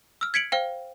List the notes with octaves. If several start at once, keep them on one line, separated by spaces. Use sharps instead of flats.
E6 F6
G#6 B6 C#7 D7 F#7
C5 F5 G5